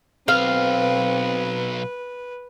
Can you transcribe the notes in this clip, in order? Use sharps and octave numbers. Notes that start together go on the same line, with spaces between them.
B1 C4 B4 F5